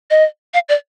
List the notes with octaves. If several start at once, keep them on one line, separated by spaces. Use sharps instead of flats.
D#5
F5
D5